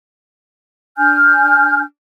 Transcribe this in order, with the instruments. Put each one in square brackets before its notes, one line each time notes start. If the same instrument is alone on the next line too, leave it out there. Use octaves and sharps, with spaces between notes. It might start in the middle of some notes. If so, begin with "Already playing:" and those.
[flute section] D4 G#5 F6 G6